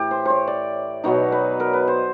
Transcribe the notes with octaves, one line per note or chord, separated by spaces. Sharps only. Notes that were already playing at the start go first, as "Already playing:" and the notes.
Already playing: A2 E3 G4
C5
C5 C#5
D5
B2 F#3 B3 D#4 C#5
B4
A#4
B4
C5